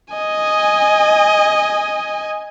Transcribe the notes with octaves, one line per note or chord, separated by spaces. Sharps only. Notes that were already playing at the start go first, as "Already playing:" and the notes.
D#5 G#5